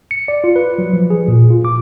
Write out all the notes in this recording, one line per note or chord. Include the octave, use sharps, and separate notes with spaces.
C#7
D5
F4
B4
F#3
F3
G#4
A#2
F4
D6